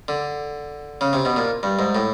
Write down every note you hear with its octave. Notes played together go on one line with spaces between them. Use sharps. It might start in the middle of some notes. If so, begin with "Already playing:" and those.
D3
C#3
C3
B2
A#2
G2
G#2
A2